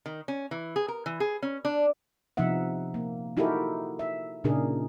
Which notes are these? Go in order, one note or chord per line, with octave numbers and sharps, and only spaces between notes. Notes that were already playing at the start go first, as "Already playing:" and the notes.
D#3
C#4
E3
G#4
A#4
E3
G#4
C#4
D4
C3 F3 B3 D#4 E5 F#5
A#3
D#4 E4 F#4 G4 A4 A#4
E5
A#2 C#3 D4 D#4 G#4 A#4